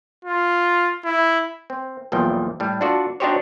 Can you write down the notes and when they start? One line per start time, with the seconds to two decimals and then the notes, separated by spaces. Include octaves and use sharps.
0.25 F4
1.05 E4
1.70 C4
2.12 B1 E2 A#2 F3 G5
2.60 A2 G3
2.81 D4 F4 F#4 A4 D5
3.20 D4 D#4 F#4 G4 C5 C#5